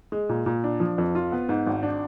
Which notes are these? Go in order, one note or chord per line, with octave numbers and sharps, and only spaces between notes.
G#3
A#2
A#2
D4
F3
F2
F4
B3
G#2
G#1
D4